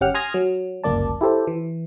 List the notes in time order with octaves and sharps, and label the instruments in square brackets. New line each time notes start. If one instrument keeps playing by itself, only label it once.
[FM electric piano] G1 C#4 G4 F#5 G5 F6
G#5 C6 D#6 F6 G#6 A#6
F#3
G1 C#2 F#2 A#3 D5 A5
E4 G4 A4 C5
E3